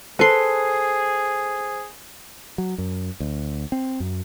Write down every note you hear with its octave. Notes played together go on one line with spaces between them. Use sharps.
G#4 A4 B4 C5 C6 C7
F#3
F#2
D2
C4
F#2